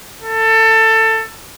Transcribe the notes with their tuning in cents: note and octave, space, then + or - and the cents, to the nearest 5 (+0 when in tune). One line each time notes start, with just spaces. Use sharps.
A4 +20